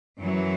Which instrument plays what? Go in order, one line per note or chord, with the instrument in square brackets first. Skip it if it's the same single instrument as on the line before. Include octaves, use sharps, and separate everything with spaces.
[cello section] F#2 E3 F#3